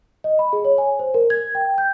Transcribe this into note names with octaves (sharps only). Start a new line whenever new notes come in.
D#5
B5
G#4
C#5
G#5
C5
A#4
G#6
G5
G6